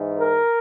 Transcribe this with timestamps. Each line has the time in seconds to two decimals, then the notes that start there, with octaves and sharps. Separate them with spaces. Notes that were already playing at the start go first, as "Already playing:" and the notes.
Already playing: G#2 E3
0.21 A#4